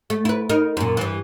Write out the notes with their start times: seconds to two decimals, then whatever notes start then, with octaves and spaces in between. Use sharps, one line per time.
0.10 A3
0.25 E4 B4
0.49 D#4 A#4
0.77 F#2 A#2
0.97 G2 E3